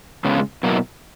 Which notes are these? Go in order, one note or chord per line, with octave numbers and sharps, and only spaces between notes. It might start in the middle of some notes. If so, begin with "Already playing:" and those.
C#3 G#3 B3
B2 F#3 A#3 E4 A#4